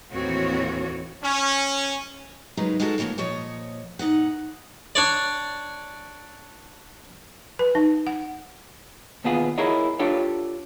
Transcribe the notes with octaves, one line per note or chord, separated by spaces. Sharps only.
D#2 A2 E3 C4 F#4 C#5
C#4
C#3 F#3 G#3 D#4 A#4 B4
G#3 D#4 F4 F#4 A4
C#3 F3 G3 A#3 C#4
A#2 F3 C#5 D#5
A#2 D#4 D#5 F#5
D4 C#5 D5
B4
D#4
F#5
D#2 B2 B3 F4 G#4 F#5
E4 F#4 G#4 A#4 C#5 D#5
D4 F4 G4 A4 C#5